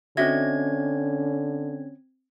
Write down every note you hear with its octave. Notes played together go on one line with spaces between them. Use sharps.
D3 C4 C#4 F#4 D#5 E5 G#6